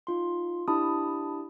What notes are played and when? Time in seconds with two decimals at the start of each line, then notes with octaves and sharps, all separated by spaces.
0.07 D#4 F4 C6
0.68 D4 E4 G4 A5 B5 D#6